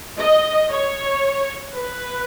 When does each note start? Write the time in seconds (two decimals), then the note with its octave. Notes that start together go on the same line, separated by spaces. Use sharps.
0.18 D#5
0.70 C#5
1.75 B4